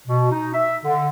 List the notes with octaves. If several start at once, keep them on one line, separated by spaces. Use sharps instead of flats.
B2
D#4
E5
D3